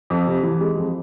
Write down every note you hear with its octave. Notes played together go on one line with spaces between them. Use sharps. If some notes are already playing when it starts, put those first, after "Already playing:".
F2
C3
E3
G#3
F2